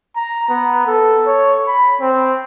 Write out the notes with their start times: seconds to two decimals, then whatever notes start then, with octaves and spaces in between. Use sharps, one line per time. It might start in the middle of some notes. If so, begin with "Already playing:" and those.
0.16 A#5
0.49 B3
0.87 A4
1.27 C#5
1.67 B5
2.01 C4